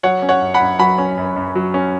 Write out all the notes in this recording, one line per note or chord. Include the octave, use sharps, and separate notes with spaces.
F#3 C#5 F#5
C#4
C#5 F#5
F#2
F#5 B5
F#2
F#3 F#5 B5
C#4
F#2
F#2
F#3
C#4